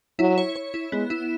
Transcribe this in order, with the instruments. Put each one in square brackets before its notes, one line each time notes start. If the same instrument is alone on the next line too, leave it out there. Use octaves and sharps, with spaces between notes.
[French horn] F#3 [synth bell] E4
[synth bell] C#5
C#5
E4
[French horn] G#3 [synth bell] B3
[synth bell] E4